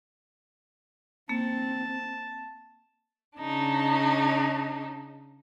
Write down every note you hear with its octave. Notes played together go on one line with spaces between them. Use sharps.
A#3 C4 A5
C#3 D4 D#4